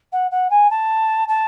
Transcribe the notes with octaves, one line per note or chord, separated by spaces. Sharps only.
F#5
F#5
G#5
A5
A5